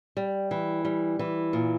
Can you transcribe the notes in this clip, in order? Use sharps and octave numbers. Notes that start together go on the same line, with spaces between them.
G3
E3
G3
E3
A#2